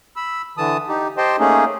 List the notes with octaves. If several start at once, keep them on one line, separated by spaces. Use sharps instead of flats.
B5 E6
D3 E3 A5 D#6
D#4 G4
G4 C5 D#5 G5 A5 C6
A3 A#3 C#4 D#4 G#4